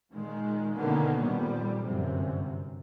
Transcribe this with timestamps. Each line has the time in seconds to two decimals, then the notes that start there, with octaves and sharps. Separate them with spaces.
0.11 A#2 D#3 G#3
0.75 B2 D3 D#3 A#3 B3 C#4
1.22 F2 A#2 G3
1.87 G1 F#2 C3